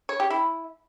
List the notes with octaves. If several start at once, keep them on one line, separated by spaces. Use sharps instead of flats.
C#5
G4
E4